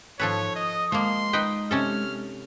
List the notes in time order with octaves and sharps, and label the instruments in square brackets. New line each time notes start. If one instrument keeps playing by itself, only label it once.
[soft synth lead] G#2 [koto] F3 A4 B4 [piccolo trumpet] C#5
[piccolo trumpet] D#5 [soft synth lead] D#6
[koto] F3 A#3 [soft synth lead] G#3 [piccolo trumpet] C6
[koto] D#4 B4 G5
[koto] C3 C#4 A4 [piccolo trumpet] F6